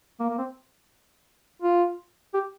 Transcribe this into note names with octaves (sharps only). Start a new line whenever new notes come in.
A#3
A#3
C4
F4
G4